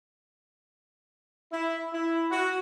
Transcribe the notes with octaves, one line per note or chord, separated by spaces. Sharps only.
E4
E4
F#4